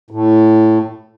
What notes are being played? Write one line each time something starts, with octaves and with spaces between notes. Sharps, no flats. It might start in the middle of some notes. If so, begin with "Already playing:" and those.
A2